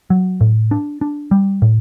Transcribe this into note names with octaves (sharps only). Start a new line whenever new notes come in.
F#3
A2
D4
D4
G3
A2